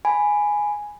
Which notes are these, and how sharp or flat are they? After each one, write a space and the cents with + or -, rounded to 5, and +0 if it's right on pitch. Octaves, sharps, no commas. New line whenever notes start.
G#5 +0 B5 +0